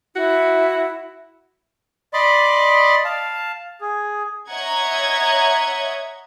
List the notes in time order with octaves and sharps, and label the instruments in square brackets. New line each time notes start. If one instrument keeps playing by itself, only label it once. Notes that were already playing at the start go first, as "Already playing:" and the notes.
[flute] E4 [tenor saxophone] F#4
[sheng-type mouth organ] D5 D#5 B5 C6 D6
F5 A5
G#4
[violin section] C#5 D#5 E5 F#5 A#5 G#6